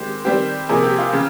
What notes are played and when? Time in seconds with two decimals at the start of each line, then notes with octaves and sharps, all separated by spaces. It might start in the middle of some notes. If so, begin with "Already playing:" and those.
Already playing: D#3 G#3 C4 G4
0.25 D#3 G3 C4 G4
0.69 C3 F3 A#3 G#4
0.84 G4
0.98 F4
1.13 C#3